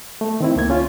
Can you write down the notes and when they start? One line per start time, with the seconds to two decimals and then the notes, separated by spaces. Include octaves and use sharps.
0.21 A3
0.41 D#3 C4 E4
0.56 C#2 A#3 G#6
0.70 C#4 F4